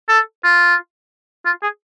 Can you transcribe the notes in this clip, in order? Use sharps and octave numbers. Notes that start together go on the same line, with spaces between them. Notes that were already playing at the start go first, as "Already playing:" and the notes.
A4
F4
F4
G#4